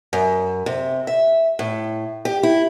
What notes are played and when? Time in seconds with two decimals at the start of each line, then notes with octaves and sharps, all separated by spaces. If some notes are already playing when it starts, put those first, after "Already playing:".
0.13 F#2
0.66 C3
1.07 E5
1.59 A2
2.25 G4
2.43 E4